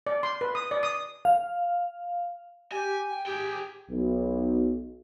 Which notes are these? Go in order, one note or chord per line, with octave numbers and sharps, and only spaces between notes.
D5
C6
B4
D#6
D5
D#6
F5
G4 G#5
G5
G4 G#4 G5
B1